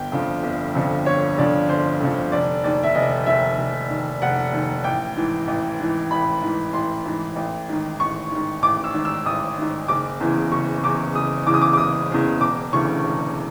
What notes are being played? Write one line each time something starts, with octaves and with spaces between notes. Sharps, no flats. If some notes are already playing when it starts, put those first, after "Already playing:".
Already playing: G1 G5
F2 D3 F3
G1
F2 D3 F3
G1 C#5
F2 D3 F3 D5
G1 C5
F2 D3 F3
F1 D5
D#2 D#3 D5
E5
F1 D#5
D#2 D#3 E5
F1
D#2 D#3
F1 F#5
D#2 D#3
A1 G5
G#2 E3
A1
G#2 E3
A1 B5
G#2 E3
A1 C6
G#2 E3
A1
G#2 D#3
A1 C#6
G#2 D#3
A1 D6
E6
G#2 D#3
E6
A1 D#6
G#2 D#3
F#1 D6
E2 C#3 E3
F#1 C#6
E2 C#3 E3 D6
F#1 D#6
E2 C#3 E3 D6
D#6
D6
D6
F#1 D#6
E2 C#3 E3
E1 D6
D2 C#3 E3 C#6
E1